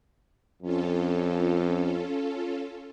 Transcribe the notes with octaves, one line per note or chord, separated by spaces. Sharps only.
F2 C#4 F4 A4